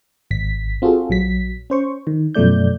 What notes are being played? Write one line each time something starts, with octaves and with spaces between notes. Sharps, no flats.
G#1 B6
C4 F4 F#4 G#4 A4
A#1 F#3 B6
C#4 C5 C#6
D#3
F#2 B2 F3 A3 D5 G6